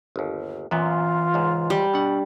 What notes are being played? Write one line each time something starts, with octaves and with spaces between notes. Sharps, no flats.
G1 D#2
F#2 A#2 E3 B3 F4
C#2 G#2
G3
B2 D4 F#5